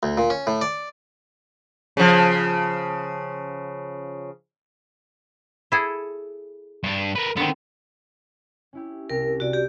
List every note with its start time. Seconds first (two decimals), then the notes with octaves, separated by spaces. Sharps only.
0.03 D2
0.18 A#2
0.30 C#4
0.47 A2
0.61 D5
1.97 C#3 F3
5.72 E4 G#4 A4
6.84 G2 D4
7.15 A#4 B4
7.37 D3 D#3 B3 C4
8.73 C#4 E4 G4
9.10 C2 G4 A#4
9.40 C3 F#4 D5
9.53 G4